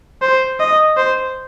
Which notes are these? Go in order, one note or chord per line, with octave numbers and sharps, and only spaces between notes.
C5
D#5
C5